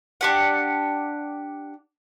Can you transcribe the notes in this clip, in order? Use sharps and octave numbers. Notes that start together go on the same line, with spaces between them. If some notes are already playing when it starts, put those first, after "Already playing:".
D4 G4 F#5